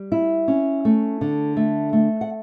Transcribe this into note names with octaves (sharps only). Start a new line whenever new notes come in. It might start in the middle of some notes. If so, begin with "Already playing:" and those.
Already playing: G3
E4
C#4
A3
D3
A3
A3
F#5